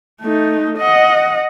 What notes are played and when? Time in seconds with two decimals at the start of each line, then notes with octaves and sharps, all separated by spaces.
0.21 A3 D#4
0.78 D#5 F#5